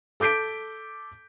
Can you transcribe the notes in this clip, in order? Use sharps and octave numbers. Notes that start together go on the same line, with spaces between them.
A4 D6 G6 B6 D7